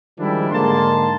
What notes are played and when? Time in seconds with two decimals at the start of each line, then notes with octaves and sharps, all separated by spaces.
0.19 D#3 F3 G3 G#3 D4 E4
0.50 G#2 D3 G#3 A#3 A5 C6